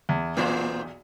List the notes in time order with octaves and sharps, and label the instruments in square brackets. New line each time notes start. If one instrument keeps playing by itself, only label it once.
[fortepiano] E2
[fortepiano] B1 E2 A#2 [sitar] A#3 F4 C5